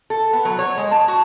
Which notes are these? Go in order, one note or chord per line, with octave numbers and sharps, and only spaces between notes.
A4
B3
F#3
C#5
G#3
A5
F#4